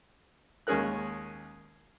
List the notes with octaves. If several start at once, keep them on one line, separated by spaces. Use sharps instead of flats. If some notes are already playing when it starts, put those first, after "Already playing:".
D#2 G#3 C#4 G#4 A#4 F#6